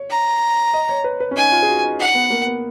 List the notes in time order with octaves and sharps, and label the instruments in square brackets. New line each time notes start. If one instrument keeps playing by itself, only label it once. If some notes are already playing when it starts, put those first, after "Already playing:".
Already playing: [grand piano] C#5
[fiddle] A#5
[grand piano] D#5
C#5
B4
B4
C#4
[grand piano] D#4 [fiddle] G#5
[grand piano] F4
G#4
F#4
D#4
[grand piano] D#4 [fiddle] F#5
[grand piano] B3
A#3
B3